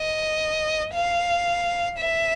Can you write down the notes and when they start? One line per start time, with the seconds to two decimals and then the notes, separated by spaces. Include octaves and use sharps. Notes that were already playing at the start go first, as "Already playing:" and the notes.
Already playing: D#5
0.94 F5
1.98 E5